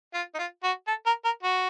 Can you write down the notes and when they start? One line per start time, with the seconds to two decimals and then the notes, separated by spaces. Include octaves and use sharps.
0.14 F4
0.35 D#4
0.39 F4
0.64 F#4
0.88 A4
1.06 A#4
1.25 A#4
1.43 F#4